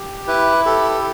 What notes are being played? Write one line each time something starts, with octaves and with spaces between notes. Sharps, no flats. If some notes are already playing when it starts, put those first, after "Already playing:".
Already playing: G4
E4 B4
G4 A4